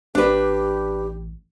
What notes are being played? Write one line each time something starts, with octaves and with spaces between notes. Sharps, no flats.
A1 D4 G4 B4